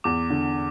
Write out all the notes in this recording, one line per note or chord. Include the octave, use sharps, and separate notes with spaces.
E2 D6
D3